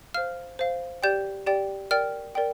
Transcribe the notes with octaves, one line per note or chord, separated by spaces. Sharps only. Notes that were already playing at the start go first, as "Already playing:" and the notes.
C5 F5 F6
C5 F5
G4 D5 G5 G6
G4 D5 G5
A#4 D5 G5 F6
A#4 D5 G5